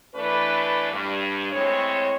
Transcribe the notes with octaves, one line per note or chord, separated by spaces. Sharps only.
E3 A3 D4 B4
G2
A2 G#3 C4 C#5